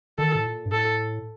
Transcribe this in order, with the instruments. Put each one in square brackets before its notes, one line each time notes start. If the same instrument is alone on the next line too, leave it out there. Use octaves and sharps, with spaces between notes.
[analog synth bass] D#3 [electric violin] A4
[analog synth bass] A2
A#2
G2
[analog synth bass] A2 [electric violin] A4